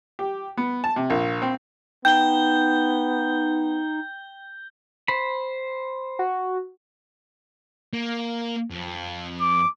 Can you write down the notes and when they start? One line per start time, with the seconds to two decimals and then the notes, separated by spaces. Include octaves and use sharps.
0.19 G4
0.57 B3
0.84 A5
0.96 C3
1.10 A#1
1.42 C4
2.05 B3 D#4 G5 G6 G7
5.08 C5 B5
6.19 F#4
7.93 A#3
8.70 F2
9.41 D6